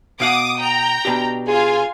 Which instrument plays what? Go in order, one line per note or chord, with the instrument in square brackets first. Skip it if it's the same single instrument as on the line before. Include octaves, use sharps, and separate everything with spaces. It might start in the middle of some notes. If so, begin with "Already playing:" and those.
[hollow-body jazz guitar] B2 F5 F#5 [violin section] D6 D#6
[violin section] G5 A#5
[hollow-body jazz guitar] B2 D4 G4
[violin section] F4 G#5 [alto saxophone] G#4